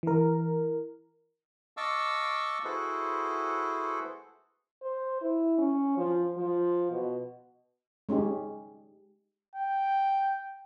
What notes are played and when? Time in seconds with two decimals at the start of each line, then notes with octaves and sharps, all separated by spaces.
0.03 E3 A#4
1.77 D#5 F5 A5 C#6 D6 E6
2.64 E4 F#4 G#4 A4 B4 C5
4.82 C5
5.21 E4
5.58 C#4
5.97 F3
6.37 F3
6.91 B2
8.09 G#3 C#4 D#4 G4
9.55 G5